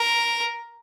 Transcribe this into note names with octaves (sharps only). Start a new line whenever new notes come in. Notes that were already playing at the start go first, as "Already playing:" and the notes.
Already playing: A#4